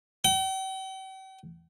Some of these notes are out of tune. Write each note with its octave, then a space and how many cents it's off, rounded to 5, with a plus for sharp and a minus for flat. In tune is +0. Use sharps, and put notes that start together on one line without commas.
G5 -45